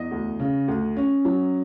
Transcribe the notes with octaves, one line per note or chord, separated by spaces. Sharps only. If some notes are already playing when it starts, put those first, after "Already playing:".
Already playing: E2 D#5
D2
C#3
D2
C#4
F#3